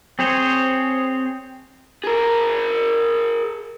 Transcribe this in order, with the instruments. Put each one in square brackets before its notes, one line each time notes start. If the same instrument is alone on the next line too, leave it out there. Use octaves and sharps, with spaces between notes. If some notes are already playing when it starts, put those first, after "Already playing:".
[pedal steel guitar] C4 G#4 C5 C#5
[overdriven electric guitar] G#4 A#4